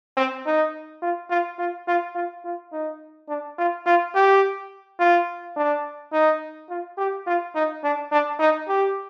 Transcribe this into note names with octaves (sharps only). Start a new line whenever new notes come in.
C4
D#4
F4
F4
F4
F4
F4
F4
D#4
D4
F4
F4
G4
F4
D4
D#4
F4
G4
F4
D#4
D4
D4
D#4
G4